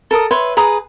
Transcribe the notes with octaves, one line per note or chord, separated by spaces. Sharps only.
A4 A#4 D#6
B4 C#5 E5 C6
G#4 B4 A#5 D#6